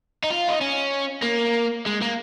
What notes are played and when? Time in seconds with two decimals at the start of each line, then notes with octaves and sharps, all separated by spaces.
0.24 D#4
0.30 F4
0.49 D#4
0.61 C#4
1.23 A#3
1.86 G#3
2.02 A#3